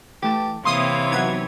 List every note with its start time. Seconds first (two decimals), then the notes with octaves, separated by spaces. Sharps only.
0.23 E3 A3 G4 A5
0.65 C3 E3 A#3 C#5 F5 C6 D#6
1.12 F#3 B3 D#4 G#6